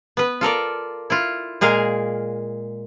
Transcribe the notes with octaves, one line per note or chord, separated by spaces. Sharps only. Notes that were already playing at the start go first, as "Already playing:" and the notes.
B3 B4
F4 A4 A#4 D5
E4 F4
A#2 G#3 G#4 A#4 F5